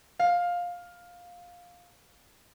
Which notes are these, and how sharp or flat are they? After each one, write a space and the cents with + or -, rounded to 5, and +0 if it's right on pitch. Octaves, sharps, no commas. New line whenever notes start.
F5 +15